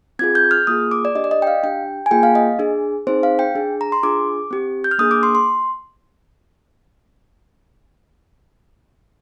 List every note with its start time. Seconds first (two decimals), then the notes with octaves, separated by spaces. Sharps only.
0.19 C4 F4 G#4 G#6
0.35 G6
0.51 F6
0.67 A#3 F4 G#4 D#6
0.91 D6
1.05 D5
1.15 D4 G4 D#5
1.24 D5
1.31 D#5
1.42 G5
1.47 F5
1.63 D4 G4 G5
2.06 G#5
2.11 A#3 F4 G#4 G5
2.23 F5
2.35 D#5
2.59 D4 G#4
3.07 C4 D#4 G#4 C5
3.23 F5
3.39 G5
3.55 D4 G#4
3.81 A#5
3.92 C6
4.03 D4 F4 G#4 D6
4.51 C4 G4
4.84 G6
4.91 F6
4.98 A#3 D4 G#4 D#6
5.11 D6
5.23 C6
5.35 C6